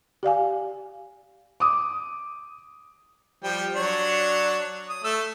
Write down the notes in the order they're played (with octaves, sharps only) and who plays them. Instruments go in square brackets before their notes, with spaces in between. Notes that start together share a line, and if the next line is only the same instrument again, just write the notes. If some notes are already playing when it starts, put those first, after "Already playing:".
[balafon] G4 D5 F5 G#5
[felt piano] D6 D#6
[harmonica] F3 G3 G5
F#3 D4 C#5
D#6
A3 E6